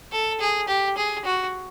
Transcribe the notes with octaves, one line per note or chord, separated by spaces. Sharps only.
A4
G#4
G4
G#4
F#4